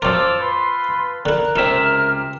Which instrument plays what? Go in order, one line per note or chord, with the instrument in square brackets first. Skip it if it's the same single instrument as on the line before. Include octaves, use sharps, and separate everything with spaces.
[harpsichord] F#2 A#4 [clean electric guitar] F4 A4 [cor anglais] C5 [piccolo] D6
[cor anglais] B4 [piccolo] C6
[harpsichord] D3 E4 [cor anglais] A#4 [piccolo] F#6
[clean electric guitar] C#2 C3 E5 [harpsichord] C4 D#4 [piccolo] F6